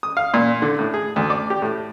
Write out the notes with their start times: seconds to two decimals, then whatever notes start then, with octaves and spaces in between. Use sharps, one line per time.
0.03 D#6
0.17 F5
0.34 A#2
0.62 D3
0.79 A2
0.94 G#4
1.16 D2
1.30 D5
1.50 G4
1.62 A2